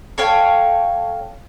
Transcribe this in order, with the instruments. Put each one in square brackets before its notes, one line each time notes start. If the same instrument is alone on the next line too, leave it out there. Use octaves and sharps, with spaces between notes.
[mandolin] A4 C#5 F5 G5